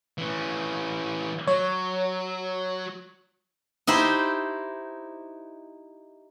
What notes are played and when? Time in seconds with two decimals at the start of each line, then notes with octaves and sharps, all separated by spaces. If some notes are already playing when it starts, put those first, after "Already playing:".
0.18 E3 C#4
1.47 F#3 C#5
3.87 D#4 E4 G4 C5